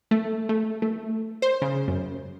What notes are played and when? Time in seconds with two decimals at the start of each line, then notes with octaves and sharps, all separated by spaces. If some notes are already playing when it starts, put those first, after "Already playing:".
0.11 A3
0.49 A3
0.82 A3
1.42 C5
1.62 C#3
1.88 F#2